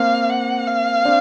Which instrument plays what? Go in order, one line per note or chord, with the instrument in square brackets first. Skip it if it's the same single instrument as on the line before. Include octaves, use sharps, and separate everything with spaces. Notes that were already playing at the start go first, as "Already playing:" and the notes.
Already playing: [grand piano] A#3 C4 [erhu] F5
[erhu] F#5
F5
[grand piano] C4 D4